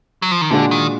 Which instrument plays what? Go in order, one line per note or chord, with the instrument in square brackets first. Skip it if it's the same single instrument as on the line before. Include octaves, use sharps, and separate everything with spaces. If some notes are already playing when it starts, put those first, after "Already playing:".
[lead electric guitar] F#3
F3
D#3
[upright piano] A#2 G#3 D4 F#4 [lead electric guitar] D3
[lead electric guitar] D#3